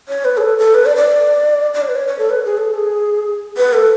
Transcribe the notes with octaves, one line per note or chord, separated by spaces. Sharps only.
C#5
B4
G#4
A4
A4
B4
D5
D5
D5
C#5
B4
C#5
C#5
A4
B4
G#4
A4
G#4
B4
A4